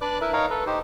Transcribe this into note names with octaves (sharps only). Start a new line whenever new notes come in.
D4 B4 D5 D6 F#6
E4 A#4 B4 E5
D#4 A#4 C#5 F5 A#5
A4 B4
D#4 G4 C5